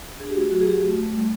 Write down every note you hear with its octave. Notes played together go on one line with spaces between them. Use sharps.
D4 G#4
G4
A3 F#4
F#3 F#4
G#4
F#4 G4
A3
A3
G3